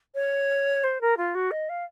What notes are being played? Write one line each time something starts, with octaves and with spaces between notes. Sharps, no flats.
C#5
C5
A#4
F4
F#4
D#5
F5